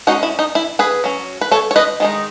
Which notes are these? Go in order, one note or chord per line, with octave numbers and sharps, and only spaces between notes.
G#3 C#4 D#4 F#4
E4
D#4
E4
G#4 B4
F#3 C#4
B4
A4 C#5
C#5
B4 D#5
D#3 G#3 D#4